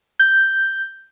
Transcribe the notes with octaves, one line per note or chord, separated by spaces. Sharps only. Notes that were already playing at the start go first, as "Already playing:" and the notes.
G6